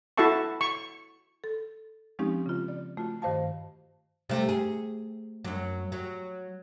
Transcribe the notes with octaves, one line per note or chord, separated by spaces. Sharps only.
E4 F#4 A4 E5 A5 C#6
C#6
A4
F3 G#3 C4 C#4 D#4 G4
C#3 F4
D5
A3 F4 F#4
G2 D#3 C5 F5 A5
C3 A3
G#4
F#2 F#3
F#3